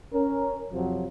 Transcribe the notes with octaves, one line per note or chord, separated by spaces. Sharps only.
C#4 A#4
F2 C3 F3 F#3